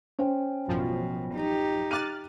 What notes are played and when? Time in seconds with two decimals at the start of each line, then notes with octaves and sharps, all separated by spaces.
0.19 C#4 C5 G5
0.68 A1 F#2 B2 F3
1.34 D#4 G4
1.91 D6 F6 F#6 A6 D#7